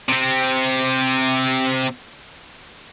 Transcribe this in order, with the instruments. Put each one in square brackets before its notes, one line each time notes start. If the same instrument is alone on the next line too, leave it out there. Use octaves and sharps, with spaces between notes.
[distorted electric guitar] C3 C4